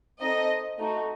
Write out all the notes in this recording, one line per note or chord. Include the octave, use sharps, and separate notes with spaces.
C4 D#4 A4 D#5
A3 D#4 F#4